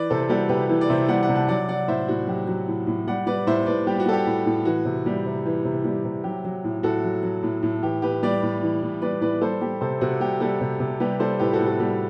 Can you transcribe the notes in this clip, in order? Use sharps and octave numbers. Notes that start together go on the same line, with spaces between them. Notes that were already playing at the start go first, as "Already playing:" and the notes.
Already playing: E3 B4 D5
C3 A4 C5
G3 F#4 A4
C3 G4 B4
E3
D5
C3 C5 E5
G3 D5 F#5
D5 F#5
C3
F#5 A5
F#3 D5 F#5
F#3 D5 F#5
A2 C5 E5
A2 F#4
F#3 G4
F#3
A2
A2
G3 D5 F#5
G3 B4 D5
A2 C5 E5
A2 B4 D5
G3 G4
F#4
G3 A4
G4
A2
A2
E3 F#4
C3
G3
C3
E3
C3
G3
C3
F#3 G4
F#3
A2
A2 F#4 A4
F#3
F#3
A2
A2
E3 G4
A2 G4 B4
G3 B4 D5
A2
E3
A2
G3 B4 D5
A2 B4 D5
G3 A4 C5
G3 G4
C3 A4 C5
C3 F#4
G3 G4
G3 F#4 A4
C3
C3
G3 G4 B4
G3 A4 C5
A2 G4 B4
F#4 A4
A2
F#4 A4
G3 F#4